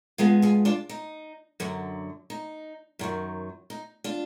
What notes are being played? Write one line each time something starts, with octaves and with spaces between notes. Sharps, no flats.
G#2 F3 G#3 B3 F4 G#4
F4 G#4
D4 F4
D#4
F#2 D3 F#3
D#4
F#2 D#3 F#3
D#4
D4 F4